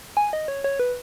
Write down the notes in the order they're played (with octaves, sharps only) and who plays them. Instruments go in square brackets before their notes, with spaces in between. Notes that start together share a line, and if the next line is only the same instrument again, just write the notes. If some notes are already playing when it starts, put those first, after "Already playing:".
[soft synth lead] G#5
D#5
C#5
C#5
B4